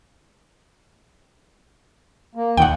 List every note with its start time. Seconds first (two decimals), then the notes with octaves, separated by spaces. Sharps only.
2.35 A#3
2.57 D#2 D#3 F#5 G5